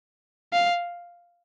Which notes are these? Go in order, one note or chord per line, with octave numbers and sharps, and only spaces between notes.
F5